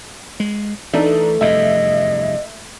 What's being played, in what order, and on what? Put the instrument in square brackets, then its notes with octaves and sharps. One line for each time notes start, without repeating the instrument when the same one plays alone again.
[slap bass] G#3
[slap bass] E3 [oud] A3 [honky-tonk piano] D4 D#4
[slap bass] F1 E2 G2 [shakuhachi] D#5 [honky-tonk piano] E5